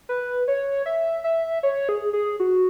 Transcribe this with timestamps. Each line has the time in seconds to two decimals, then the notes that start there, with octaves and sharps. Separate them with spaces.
0.09 B4
0.48 C#5
0.86 E5
1.24 E5
1.63 C#5
1.89 G#4
2.13 G#4
2.40 F#4